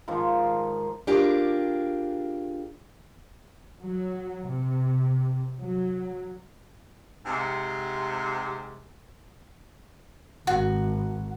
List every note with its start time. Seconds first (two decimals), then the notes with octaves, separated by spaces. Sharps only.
0.08 G#2 D#3 F3
1.07 D4 F4 G4 G#4 A#4
3.82 F#3
4.48 C3
5.61 F#3
7.26 G#2 C3
10.47 G#1 F#4